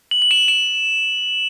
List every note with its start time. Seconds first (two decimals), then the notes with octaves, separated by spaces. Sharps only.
0.11 F#7
0.22 F#7
0.31 E7
0.48 E7